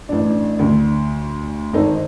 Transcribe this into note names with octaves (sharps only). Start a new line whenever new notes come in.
A1 D4
D2
G#1 D3 D#4 A4 C5